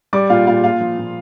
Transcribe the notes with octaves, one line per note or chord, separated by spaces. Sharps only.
G3 D5 D6
A#2 F4 F5
A#2 F4 F5
A#2 F4 F5
F3
A#2